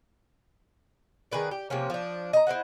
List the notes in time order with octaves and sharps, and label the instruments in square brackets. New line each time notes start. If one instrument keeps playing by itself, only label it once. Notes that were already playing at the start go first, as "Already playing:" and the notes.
[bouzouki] D#3 G#4 B4 D5
G4
C3 F3 A#3 C#4
F3 D4
D#5 A#5
E4 C5 D#5 F#5